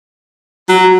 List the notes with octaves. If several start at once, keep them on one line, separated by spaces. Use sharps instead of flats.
F#3